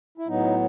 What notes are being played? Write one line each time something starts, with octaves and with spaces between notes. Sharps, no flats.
E4
A2 F#3 B3 D#4